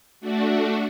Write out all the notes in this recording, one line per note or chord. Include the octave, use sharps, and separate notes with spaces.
A3 D4 F#4